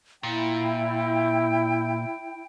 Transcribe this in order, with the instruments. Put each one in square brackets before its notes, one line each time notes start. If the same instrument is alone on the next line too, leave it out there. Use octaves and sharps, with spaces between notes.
[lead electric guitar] A#2 [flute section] E4 G5